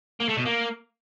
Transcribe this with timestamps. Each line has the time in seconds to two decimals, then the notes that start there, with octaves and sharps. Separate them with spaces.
0.20 A#3
0.29 A3
0.37 B2
0.46 A#3